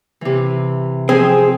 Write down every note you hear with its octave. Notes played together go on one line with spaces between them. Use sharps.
C3 E3
F3 C4 G#4